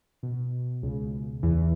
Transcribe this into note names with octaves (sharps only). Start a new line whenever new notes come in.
B2
C#2 C#3
E2 E3